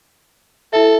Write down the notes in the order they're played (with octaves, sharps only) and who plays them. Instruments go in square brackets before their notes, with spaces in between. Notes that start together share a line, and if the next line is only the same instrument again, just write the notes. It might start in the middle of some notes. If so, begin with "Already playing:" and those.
[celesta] E4 E5 [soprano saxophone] A4